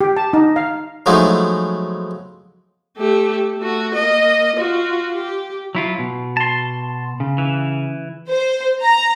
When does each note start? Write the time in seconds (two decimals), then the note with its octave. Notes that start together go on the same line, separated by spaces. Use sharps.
0.01 G4
0.17 A5
0.33 D#4
0.56 F5
1.06 F3 F#3 G#3 A3 D#4 E4
2.97 A3 G4
3.57 A3 F#4
3.94 A#3 D#5
4.56 F4 F#4
5.13 G4
5.75 F#3 E4 F4
5.99 B2
6.37 A5 C6
7.20 C#3
7.38 E3
8.29 C5
8.82 A#5